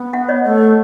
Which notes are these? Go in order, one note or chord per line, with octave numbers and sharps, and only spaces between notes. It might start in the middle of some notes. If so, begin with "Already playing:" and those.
Already playing: B3
E5 F#5
C#5 D#5
A3